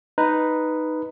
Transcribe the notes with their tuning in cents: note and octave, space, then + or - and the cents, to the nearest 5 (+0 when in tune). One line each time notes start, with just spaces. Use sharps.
D#4 +0 B4 +0